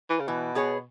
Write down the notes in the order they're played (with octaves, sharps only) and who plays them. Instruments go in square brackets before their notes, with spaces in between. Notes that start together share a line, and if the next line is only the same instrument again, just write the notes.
[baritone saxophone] E3
C#3
[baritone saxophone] B2 [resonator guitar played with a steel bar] E3
[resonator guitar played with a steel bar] B3 G#4 C#5